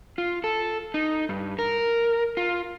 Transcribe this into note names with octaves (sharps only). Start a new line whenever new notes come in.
F4
A4
D#4
G2
A#4
F4